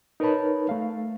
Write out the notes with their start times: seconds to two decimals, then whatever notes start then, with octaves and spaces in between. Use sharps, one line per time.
0.20 D#4 A#4 B4 C#5 A5 B5
0.69 A3 F5